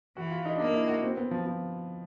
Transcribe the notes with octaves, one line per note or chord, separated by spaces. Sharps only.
E3 F#4
F4
D#4
D4
A#3 D#4
E4
F#4
C4
B3
F3
F3